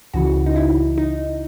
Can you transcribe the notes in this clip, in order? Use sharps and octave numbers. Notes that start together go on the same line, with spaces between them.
C#2 C#3 E3 F#4
D#4
E4
D#4